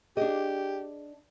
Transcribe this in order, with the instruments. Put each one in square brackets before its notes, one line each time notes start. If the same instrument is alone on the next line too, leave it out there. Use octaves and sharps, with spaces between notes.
[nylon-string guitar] D4 D#5 [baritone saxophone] G4 [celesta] G#4